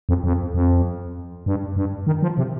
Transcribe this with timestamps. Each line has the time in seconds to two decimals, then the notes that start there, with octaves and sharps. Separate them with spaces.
0.09 F2
0.24 F2
0.54 F2
1.46 G2
1.76 G2
2.07 D#3
2.22 F3
2.38 C3